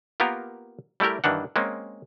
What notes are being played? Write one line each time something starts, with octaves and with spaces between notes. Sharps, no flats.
A#3 B3 F4 G4 A#4
G3 A3 E4 G4 A#4
G2 D#3 E3 D4 F#5
G#3 A#3 C4 C#4